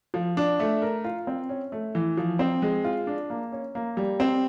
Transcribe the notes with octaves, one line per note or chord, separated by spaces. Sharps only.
F3
D4
A3
A#4
F4
C4
C#4
A3
E3
F3
C4
G#3
F4
D4
A#3
C#4
A#3
G3
C4